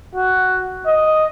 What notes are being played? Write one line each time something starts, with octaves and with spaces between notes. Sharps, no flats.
F#4
D#5